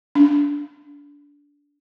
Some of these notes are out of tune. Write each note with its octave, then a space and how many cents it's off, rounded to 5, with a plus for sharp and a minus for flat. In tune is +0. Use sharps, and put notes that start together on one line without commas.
D4 -20